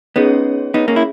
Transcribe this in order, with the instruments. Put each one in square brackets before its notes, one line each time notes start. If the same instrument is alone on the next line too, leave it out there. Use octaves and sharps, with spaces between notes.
[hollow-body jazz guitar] B3 D#4 [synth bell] C#4 G#4 C#5
[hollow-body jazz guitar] B3 D#4
A#3 C#4
E4